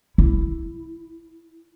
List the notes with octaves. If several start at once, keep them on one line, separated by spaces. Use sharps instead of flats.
E4